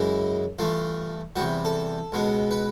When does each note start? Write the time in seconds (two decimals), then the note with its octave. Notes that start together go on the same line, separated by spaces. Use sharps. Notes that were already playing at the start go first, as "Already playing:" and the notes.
Already playing: F#2 C#3 E3 G#3 E4
0.59 G2 E3 A3 F4
1.36 E2 C3 E3 G3 F#4
1.65 A4
2.12 C#2 B2 G#3 B3
2.51 B4